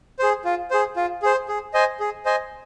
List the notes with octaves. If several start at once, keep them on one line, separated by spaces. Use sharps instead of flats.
G#4 C5
F4
G#4 C5
F4
G#4 C5
G#4
C5 D#5 G#5
G#4
C5 D#5 G#5